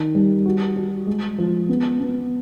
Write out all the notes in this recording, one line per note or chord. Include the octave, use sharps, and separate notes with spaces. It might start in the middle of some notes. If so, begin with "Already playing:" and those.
Already playing: D#3
G3
F#4
F#4
G#3
F3
B3
B3